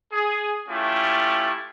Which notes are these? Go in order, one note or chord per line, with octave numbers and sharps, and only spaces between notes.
G#4
A3 C#4 E4 F4 G4